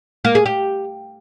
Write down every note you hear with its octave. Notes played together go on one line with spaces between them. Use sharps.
A#3
G#4
G4